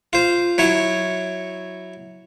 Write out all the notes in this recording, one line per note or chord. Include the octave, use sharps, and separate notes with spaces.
F4 C5
F#3 E4 C#5